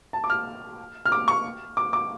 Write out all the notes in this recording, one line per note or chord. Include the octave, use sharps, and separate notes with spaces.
A5
D6
F6
F6
D6
C#6
D6
D6